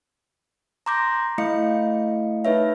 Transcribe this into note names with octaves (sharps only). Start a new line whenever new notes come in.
A#5 C6 D6 G6 A#6
A3 E4 D#5 F5 C#7
D#4 B4 C#5 E5